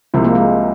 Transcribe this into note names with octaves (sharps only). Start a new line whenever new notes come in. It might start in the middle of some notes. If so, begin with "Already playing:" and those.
C2 C3 F3 G#3
A#3
G#3